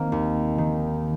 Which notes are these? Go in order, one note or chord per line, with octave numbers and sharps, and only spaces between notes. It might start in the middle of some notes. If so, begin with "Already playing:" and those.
Already playing: D#3 A#3 C4
D#2
D#3